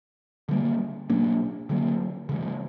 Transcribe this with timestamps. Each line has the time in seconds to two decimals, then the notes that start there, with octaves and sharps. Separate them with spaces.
0.49 D3 G3 A#3
1.10 B2 F#3 A#3 D4
1.69 D3 F#3 A#3
2.29 C#3 E3 G#3